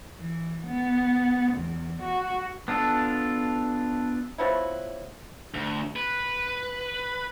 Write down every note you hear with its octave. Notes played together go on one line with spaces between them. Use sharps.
E3
B3
E2
F#4
B3 D4 F4 A4
F3 F#3 B3 E4
D2
B4